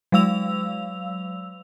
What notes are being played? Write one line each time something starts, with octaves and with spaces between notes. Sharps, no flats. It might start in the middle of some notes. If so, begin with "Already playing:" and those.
F#3 G#3 F5 E6 F7